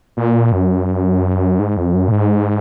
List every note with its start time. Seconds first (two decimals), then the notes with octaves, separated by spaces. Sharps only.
0.17 A#2
0.52 F#2
1.59 G#2
1.77 F2
1.94 F#2
2.08 A#2
2.12 G#2